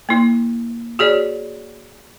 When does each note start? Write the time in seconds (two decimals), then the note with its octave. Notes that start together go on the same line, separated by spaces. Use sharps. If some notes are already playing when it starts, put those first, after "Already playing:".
0.09 A#3 E4
0.99 F#4 G#4 C#5 D5